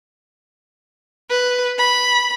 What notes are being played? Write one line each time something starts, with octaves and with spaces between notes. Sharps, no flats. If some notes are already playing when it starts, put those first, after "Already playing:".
B4
B5